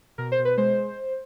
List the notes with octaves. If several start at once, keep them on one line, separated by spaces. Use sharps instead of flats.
B2 A#4
C5
B2
B4
G#3 C5